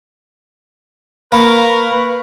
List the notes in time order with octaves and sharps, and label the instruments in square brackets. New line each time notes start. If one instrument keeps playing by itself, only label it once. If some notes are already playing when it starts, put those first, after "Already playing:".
[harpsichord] A#3 [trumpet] A#4 [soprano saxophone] B4 [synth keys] F5 B5 C#6